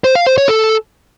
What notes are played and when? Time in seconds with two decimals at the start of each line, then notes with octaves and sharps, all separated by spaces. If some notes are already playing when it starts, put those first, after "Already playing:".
0.04 C5
0.15 F5
0.26 C5
0.38 C#5
0.49 A4